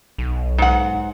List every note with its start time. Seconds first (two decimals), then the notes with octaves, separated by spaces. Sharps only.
0.18 B1
0.58 G#2 F#5